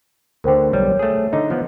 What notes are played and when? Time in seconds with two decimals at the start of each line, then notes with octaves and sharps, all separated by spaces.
0.44 D2 D3 A#4 C5 G5
0.73 B1 G3 C#5
0.99 A3 G#4
1.33 D3 D#4 D#5
1.50 F3 B3